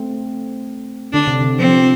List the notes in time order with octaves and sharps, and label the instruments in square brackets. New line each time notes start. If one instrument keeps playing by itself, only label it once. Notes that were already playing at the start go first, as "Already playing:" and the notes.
Already playing: [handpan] A3 C4
[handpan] D3 [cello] D4
[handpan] C3
D3
[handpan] F3 [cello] C4